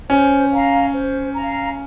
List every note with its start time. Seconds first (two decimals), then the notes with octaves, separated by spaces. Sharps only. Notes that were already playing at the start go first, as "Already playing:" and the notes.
0.10 C#4 C5
0.52 F5 A#5
0.93 C5
1.35 F5 A#5